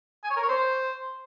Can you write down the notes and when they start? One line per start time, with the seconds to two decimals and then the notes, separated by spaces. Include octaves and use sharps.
0.24 G#5
0.30 C#5
0.36 A#4
0.42 C#5
0.48 C5